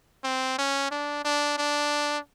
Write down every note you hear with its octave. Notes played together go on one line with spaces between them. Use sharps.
C4
C#4
D4
D4
D4